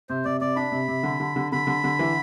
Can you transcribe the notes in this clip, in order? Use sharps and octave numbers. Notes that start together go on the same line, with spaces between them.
C3 C5
C3 D5
C3 D5
D4 B5
C3
C3
D3
D3
D3
D3 B5
D3
D3
E3